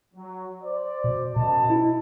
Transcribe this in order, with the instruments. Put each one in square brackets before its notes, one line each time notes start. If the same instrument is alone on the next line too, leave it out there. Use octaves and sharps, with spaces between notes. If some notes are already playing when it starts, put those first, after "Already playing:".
[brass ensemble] F#3
C5 D5
[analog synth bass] B2
[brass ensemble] F#2 D#5 A5 [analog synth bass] B2
[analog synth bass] E4